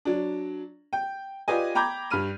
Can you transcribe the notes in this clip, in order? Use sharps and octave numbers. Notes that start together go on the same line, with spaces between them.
F#3 D4
G5
F4 G4 B4 D5 D#5 G#5
G5 A#5 B5 D6 G6 G#6
G2 B5 F6 D#7